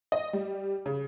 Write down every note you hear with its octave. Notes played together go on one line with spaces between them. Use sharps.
D#5
G3
C#3